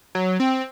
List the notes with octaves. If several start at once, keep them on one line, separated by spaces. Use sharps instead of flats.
F#3
C4